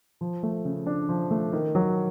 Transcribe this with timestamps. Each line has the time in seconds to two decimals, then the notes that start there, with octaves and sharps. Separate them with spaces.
0.21 F3
0.43 A3
0.65 C#3
0.86 D4
1.09 F3
1.31 A3
1.53 D#3
1.75 F#3